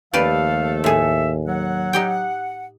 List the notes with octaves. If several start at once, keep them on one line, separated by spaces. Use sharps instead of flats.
D#2 F3 A3 G4 A4 B4 D5 F5
A2 G#4 E5
F#3 F#5
D#4 G4 G5